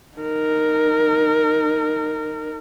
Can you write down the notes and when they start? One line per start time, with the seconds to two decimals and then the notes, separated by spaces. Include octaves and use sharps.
0.18 D#4 A#4